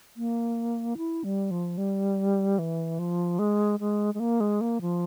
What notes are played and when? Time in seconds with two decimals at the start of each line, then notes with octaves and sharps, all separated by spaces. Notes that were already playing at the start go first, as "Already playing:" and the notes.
0.17 A#3
0.97 E4
1.24 G3
1.51 F3
1.78 G3
2.59 E3
2.99 F3
3.39 G#3
3.80 G#3
4.14 G#3
4.20 A#3
4.40 G#3
4.61 A#3
4.81 F3